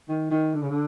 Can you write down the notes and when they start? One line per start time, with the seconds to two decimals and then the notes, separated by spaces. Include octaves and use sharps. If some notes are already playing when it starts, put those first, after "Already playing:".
0.08 D#3
0.31 D#3
0.53 D3
0.61 C#3
0.70 D3